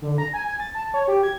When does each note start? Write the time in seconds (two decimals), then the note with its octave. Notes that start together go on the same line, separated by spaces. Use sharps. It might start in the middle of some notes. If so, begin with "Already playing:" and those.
0.02 D3
0.18 A#5
0.33 G#5
0.47 G#5
0.60 A6
0.75 A5
0.94 C#5
1.08 G4
1.23 G#6